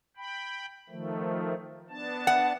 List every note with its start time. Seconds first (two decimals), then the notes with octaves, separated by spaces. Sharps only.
0.17 G5 B5
0.90 D#3 F3 A3
1.90 B3 D4 A5
2.27 F#5